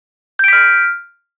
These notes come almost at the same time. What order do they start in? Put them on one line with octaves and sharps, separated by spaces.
G6 D7 B6 F6